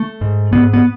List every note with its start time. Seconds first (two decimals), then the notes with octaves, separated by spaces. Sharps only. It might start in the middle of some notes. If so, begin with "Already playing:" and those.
Already playing: A3
0.21 G#2
0.52 G#2 B3
0.74 B3